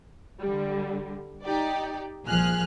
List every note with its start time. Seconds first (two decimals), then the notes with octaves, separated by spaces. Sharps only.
0.41 D3 G3
1.43 D#4 G4 D5
2.25 C2 A#2 F3 G#4 F6 F#6